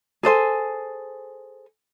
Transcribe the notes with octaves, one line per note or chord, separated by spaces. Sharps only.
G#4 A4 C5 G#5